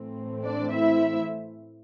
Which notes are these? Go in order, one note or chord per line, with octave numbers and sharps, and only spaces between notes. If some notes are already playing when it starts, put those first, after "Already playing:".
Already playing: A2 E3 A3 C4
D4 D5
E4 E5